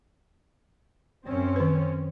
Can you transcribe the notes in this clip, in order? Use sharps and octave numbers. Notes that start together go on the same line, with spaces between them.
F#2 C4 C#4
D#3 B4